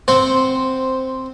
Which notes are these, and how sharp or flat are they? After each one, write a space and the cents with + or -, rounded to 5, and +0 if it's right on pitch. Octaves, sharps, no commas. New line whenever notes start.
C4 +0 C5 -5 F#5 +0